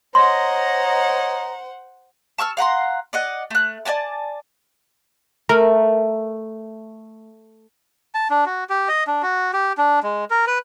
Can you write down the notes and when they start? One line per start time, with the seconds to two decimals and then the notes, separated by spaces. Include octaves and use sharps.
0.15 C5 C#5 D#5 F#5 A#5 C6
2.38 A5 C#6 E6 F6
2.57 F5 F#5 A#5 C6
3.13 D5 D#5 F#5
3.50 A3 F#6
3.85 D5 D#5 G#5 A5
5.49 A3 A#4
8.15 A5
8.30 D4
8.46 F#4
8.69 G4
8.88 D#5
9.07 D4
9.23 F#4
9.53 G4
9.78 D4
10.03 G#3
10.30 A#4
10.47 B4